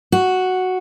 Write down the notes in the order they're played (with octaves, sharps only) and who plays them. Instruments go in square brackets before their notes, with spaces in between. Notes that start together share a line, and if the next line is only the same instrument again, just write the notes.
[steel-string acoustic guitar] F#4